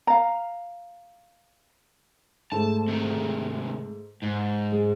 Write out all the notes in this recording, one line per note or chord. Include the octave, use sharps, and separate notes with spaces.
F5 A#5
G#2 A3 A5
C3 D#3
G#2
G#3